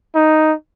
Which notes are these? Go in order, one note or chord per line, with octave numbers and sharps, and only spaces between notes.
D#4